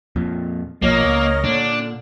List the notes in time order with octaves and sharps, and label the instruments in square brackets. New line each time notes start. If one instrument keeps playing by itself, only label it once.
[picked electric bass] F2 A#2
[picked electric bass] B1 A#2 F3 [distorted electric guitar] A#3 [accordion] A#4 D#5 [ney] C#5
[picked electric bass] C#2
[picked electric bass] A#2 [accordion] D3 [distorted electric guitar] D4